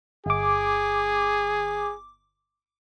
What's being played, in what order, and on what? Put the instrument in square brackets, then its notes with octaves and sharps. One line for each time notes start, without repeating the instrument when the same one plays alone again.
[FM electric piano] G1 D6 [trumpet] G#4